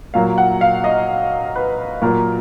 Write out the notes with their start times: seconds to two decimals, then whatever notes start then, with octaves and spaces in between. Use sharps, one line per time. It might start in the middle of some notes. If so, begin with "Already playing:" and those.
0.14 A#2 F#3 A#3 F5
0.38 F#5
0.61 F5
0.84 D#5
1.56 B4
2.02 A#2 F#3 A#3 A#4